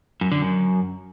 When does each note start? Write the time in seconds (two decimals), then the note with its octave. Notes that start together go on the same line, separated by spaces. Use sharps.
0.21 F#2
0.32 D3
0.42 F#2